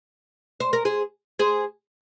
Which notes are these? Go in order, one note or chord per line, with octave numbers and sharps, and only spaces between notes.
C5
A#4
G#4 C5
G#4 C5